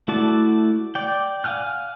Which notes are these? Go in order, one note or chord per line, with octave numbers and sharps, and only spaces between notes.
A3 E4 F#4 D5 A5
D5 G5
F5 F#5 G#5 F6 F#6